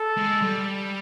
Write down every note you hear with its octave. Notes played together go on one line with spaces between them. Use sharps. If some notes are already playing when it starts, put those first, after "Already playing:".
Already playing: A4
G#3
G3